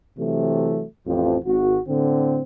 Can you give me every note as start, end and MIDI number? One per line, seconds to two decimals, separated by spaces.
0.19 0.84 48
0.19 0.84 52
0.19 0.84 54
0.19 0.84 57
1.06 1.37 33
1.06 1.37 41
1.06 1.37 53
1.45 1.79 32
1.45 1.79 66
1.88 2.42 45
1.88 2.42 50
1.88 2.42 60